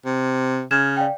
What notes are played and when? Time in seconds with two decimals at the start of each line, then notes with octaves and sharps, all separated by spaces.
0.05 C3
0.71 C#3 F6 G#6 E7
0.97 D5 F5 G5